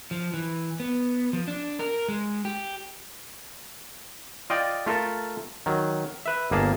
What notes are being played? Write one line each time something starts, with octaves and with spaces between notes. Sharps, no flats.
F3
E3
B3
F3
D4
A#4
G#3
G4
F4 D5 D#5 G5
A3 F4 A4 A#4
D#3 F#3
B4 E5
G1 A#3 G#4 A5